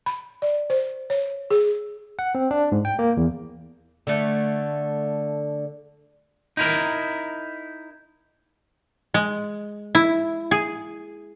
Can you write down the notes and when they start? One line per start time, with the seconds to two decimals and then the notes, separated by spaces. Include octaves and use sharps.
0.06 B5
0.42 D5
0.70 C5
1.10 C#5
1.50 G#4
2.19 F#5
2.35 C4
2.51 D4
2.72 G#2
2.85 G5
2.99 A#3
3.17 E2
4.07 D3 A3
6.57 D#4 E4 A#4
9.14 G#3
9.95 E4
10.51 G#4